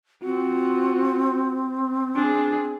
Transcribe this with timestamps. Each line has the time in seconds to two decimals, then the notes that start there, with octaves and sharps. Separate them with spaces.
0.24 C4 F4 F#4
2.16 D4 G#4